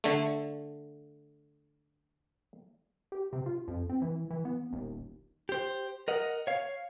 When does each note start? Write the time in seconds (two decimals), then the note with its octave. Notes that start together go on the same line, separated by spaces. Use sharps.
0.04 D3 A3
3.12 G4
3.33 C3
3.46 F4
3.68 F2
3.89 C4
4.02 E3
4.31 E3
4.45 B3
4.73 D#1
5.49 G4 C5
6.08 A#4 D#5 F#5
6.47 C#5 F5